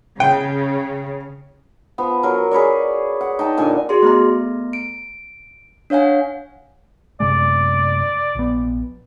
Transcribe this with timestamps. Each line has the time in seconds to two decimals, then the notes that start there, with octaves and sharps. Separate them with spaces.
0.20 C#3 G5
1.98 F3 B3
2.23 F#3 A#4
2.51 G#4 B4 C#5 D5
3.21 F#5
3.39 D#4 G5 A5
3.57 A#2 D3 G#5
3.89 F#4 G#4 D5 C6
4.03 A3 B3 A#5
4.73 D7
5.90 D4 C#5 F5 F#5 G#5
7.20 F#2 C3 G#3 D5
8.35 A#1 B3